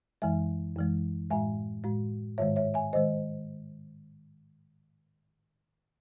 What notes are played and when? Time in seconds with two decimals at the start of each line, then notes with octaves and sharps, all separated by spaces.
0.22 F#2 E3 G#3 E5 G#5
0.76 F#2 E3 G#3
1.31 A2 G#3 E5 G#5
1.84 A2 G#3
2.38 G#2 D#3 G#3 C#5 E5
2.56 C#5 E5
2.74 E5 G#5
2.93 D#3 G#3 C5 D#5